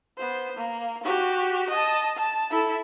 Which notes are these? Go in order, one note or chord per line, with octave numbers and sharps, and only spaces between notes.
B3 C5
A#3
F#4 G4
D#5 A5
A5
E4 A4